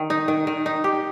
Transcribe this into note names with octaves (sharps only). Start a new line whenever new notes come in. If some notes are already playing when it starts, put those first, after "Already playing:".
Already playing: D#3
D#4
D#3
D#3
D#4
G4